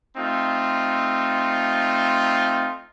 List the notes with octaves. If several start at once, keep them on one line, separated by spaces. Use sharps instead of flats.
A3 C4 D#4 F4